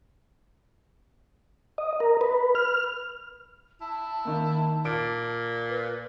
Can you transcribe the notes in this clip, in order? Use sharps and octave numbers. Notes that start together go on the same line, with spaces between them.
D#5
A#4
B4
F6
E4 A5
D#3 A#3
A#2 D6 D7
B4